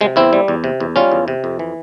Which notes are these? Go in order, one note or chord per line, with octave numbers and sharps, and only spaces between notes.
C3 G#3
E2 C4 E4
G3
E2
C3
E2
G3 C#4 F4
E2
C3
F2
E3